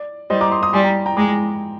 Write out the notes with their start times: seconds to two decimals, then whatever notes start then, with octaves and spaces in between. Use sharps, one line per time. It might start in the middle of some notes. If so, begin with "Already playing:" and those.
Already playing: D5
0.30 G3 C5 D#5
0.41 A#5 D6
0.52 C6 D#6
0.62 C6 D#6
0.73 G3 G#5 C6
0.84 G5 A#5
1.06 G5 A#5
1.16 G#3 A#5 D6